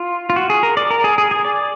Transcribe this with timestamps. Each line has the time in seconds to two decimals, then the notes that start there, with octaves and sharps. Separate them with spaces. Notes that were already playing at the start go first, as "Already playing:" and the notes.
Already playing: F4
0.30 F4
0.36 F#4
0.50 G#4
0.63 A#4
0.77 D5
0.91 A#4
1.04 G#4
1.18 G#4
1.31 G#4
1.45 D5